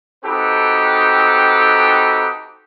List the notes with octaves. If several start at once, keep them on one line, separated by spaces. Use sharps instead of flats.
C4 D#4 F#4 G4 A4 B4